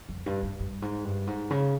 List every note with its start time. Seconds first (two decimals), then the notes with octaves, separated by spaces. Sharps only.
0.09 F2
0.26 G2
0.43 G2
0.60 G2
0.82 G#2
1.04 G2
1.27 G#2
1.51 C#3